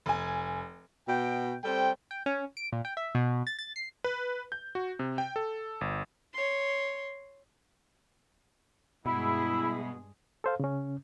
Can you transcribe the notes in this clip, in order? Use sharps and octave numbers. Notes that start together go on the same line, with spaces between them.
F1 G#5
B2 G5
G3 C4 A4 C5 G5
G5
C#4
D7
A#2
G5
E5
B2
A6
A6
C7
B4
G6
F#4
C3
G5
A4
G1
C#5 C6
G2 B2 G#3 E4 G#4 E5 B5
A4 C5 F5
C#3 C#4